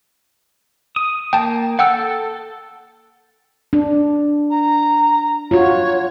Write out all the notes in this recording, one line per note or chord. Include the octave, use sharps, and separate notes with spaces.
D#6
A#3 G5 A5
A4 F#5 G5 E6
D4
A#5
F4 F#4 C#5